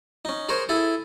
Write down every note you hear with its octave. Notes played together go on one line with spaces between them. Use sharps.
C#4 D#4
G#4 A#4 C5 C#5
E4 G#4 A4